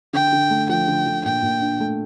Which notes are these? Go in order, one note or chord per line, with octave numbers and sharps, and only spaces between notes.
D3 G5
D3
A3
F3 G5
D3
D3
A#2 G5
A#2
D4
A3